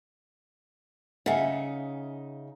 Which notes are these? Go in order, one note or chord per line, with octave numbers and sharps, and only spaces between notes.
C#3 D#4 E5 F#5 G#5